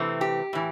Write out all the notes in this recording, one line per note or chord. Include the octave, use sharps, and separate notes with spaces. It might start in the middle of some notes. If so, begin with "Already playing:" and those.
Already playing: C3 E3 A3 C4
G4
A2 E3